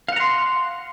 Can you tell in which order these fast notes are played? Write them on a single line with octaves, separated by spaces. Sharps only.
F5 F#5 A#5 C6